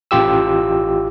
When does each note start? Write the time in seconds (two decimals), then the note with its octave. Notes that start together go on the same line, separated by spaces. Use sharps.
0.11 A1 F4 G4 E6